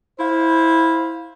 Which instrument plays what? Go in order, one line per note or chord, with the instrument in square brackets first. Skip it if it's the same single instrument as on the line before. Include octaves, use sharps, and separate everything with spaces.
[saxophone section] E4 C5 F5